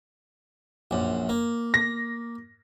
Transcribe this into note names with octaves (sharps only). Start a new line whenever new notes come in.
A#1 F#2
A#3
A#6